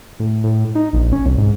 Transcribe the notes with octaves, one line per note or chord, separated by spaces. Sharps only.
A2
A2
D#4
A#1
C#4
C2
G#2